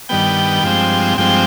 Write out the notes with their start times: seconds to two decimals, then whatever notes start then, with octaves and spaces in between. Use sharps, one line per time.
0.09 G2 D#3 G3 B3 G5
0.63 G2 F3 G#3 C4
1.18 G2 F3 G#3 C4 G5